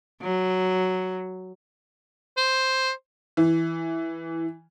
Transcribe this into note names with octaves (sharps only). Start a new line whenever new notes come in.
F#3
C5
E3